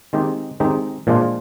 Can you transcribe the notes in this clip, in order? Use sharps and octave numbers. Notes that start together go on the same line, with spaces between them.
D#3 G#3 C4 D#4 G4
D#3 G#3 C4 D#4 G4
A#2 F3 G#3 D4 F4